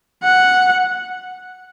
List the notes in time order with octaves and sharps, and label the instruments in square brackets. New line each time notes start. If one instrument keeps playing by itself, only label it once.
[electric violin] F#5